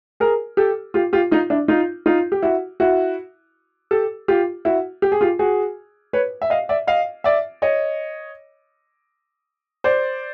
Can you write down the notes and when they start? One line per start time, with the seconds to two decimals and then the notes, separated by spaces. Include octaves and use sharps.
0.20 G#4 A#4
0.57 G4 A4
0.94 F4 G4
1.13 F4 G4
1.31 D#4 F4
1.50 D4 E4
1.68 D#4 F4
2.06 D#4 F4
2.32 G4
2.43 E4 F#4
2.80 E4 F#4
3.91 G4 A4
4.28 F4 G4
4.65 E4 F#4
5.02 G4
5.12 G#4
5.21 F4 G4
5.39 F#4 G#4
6.13 B4 C#5
6.42 E5
6.50 D#5 F5
6.69 D5 E5
6.87 D#5 F5
7.24 D5 E5
7.62 C#5 D#5
9.84 C5 D5